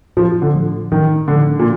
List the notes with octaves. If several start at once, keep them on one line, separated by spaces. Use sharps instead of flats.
A2 F3
D3
F3 A3 D4
A2 D#3
D3 F3 A3 D4
A#2